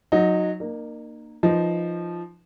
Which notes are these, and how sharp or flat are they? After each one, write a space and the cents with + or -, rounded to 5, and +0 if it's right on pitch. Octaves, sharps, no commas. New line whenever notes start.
F#3 -15 D#4 +0
A#3 +0 D#4 -45
F3 -10 D#4 +0 B4 +0